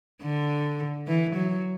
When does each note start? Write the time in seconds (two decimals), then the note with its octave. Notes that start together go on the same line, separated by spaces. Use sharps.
0.22 D3
1.07 E3
1.36 F#3